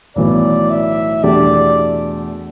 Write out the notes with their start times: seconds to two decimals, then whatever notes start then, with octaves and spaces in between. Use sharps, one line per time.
0.16 B1 A2 E3 B3 D5
0.70 E5
1.23 E2 B2 A3 D4 G4 D5